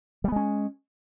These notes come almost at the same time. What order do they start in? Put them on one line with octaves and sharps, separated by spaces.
G3 B3 G#3 C#4